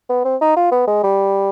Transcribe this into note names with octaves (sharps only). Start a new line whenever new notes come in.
B3
C4
D#4
F4
B3
G#3
G3